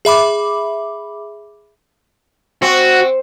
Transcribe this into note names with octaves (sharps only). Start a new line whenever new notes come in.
G#4 E5 B5 D6
C4 F#4